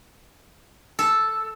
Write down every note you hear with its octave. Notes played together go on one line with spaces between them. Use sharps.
A4